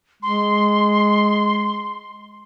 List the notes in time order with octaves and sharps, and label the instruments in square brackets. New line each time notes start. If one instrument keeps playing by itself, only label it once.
[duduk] G#3 [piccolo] C6